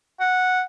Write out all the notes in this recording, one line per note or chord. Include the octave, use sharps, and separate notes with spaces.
F#5